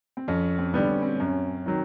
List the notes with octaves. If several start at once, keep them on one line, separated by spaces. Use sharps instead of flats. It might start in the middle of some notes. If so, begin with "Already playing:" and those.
C4
F2 C#4
C4
D3 G3 B3
C#4
C4
F#2 C#4
D#3 F#3